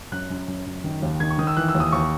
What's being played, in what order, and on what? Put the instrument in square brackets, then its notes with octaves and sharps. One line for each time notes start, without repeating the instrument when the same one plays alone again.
[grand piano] F#2 F#6
F#2
F#2
F#2
D#3
D#2
D#3 G#6
C#6
D#3 D#6
E6
E3 F#6
E6
D#2
D#6
D#2 C#6